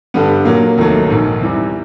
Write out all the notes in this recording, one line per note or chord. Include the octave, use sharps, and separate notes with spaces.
G2 D3 G3 B3
A#2 F#3 A#3
F1 D#2 D#3 F#3 A3
A#1 G#2 D#3
E2 C3 E3 G3